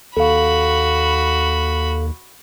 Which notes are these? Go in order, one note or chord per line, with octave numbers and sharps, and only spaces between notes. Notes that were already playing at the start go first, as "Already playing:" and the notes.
D#2 F#4 A4 F5 B5